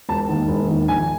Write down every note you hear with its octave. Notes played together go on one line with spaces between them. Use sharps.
E1 A5
D#2 D#3
E1
D#2 D#3
A#1 G#5